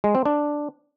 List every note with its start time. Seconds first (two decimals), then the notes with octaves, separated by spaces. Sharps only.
0.04 G#3
0.15 C4
0.25 D4